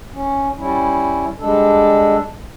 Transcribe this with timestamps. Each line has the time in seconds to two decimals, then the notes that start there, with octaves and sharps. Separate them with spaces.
0.13 C#4
0.58 G3 C#4 E4
1.40 G3 G#3 D4 A4